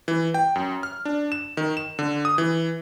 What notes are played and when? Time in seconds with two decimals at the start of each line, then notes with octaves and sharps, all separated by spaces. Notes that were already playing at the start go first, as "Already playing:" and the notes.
0.08 E3
0.34 G5
0.56 F#2
0.83 F6
1.05 D4
1.32 E7
1.57 D#3
1.77 E7
1.99 D3
2.25 D#6
2.38 E3